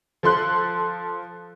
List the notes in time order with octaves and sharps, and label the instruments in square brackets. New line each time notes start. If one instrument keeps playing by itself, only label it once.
[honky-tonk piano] F3 A4 C6 F#6